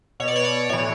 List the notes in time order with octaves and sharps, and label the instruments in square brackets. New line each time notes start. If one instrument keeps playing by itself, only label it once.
[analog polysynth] B2 C#5
D5
C#5
D5
A2 E3 C#5